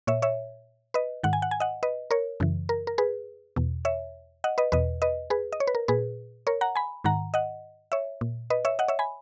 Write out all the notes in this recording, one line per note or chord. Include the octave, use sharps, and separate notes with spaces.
A#2 C#5 E5
C#5 E5
B4 D#5
G#2 D#3 F#5
G#5
F#5
G#5
D#5 F#5
B4 D#5
A#4 C#5
F#2 C#3 E3
A#4
A#4
G#4 B4
E2 B2
C#5 E5
D#5 F#5
B4 D#5
E2 B2 B4 D#5
B4 D#5
G#4 B4
D#5
C#5
B4
A#4
A#2 G#4 B4
A#4 C#5
F#5 A#5
G#5 B5
G#2 D#3 F#5 A#5
D#5 F#5
C#5 E5
A#2
B4 D#5
C#5 E5
D#5 F#5
C#5 E5
G#5 B5